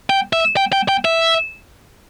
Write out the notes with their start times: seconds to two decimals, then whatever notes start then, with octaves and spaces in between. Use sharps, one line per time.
0.10 G5
0.33 E5
0.57 G5
0.73 G5
0.89 G5
1.05 E5